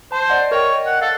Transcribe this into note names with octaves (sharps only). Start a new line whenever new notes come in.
C5 A5
D5 D#5 F#5
A#4 C#5 D#5 G5
F#5
A4 F5